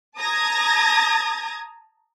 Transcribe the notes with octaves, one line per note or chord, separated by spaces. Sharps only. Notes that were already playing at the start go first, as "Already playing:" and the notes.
A5 A#5 D#6 G#6 A#6